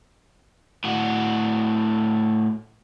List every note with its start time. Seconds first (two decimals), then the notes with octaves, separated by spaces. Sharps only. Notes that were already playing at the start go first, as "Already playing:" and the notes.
0.84 A2 F#4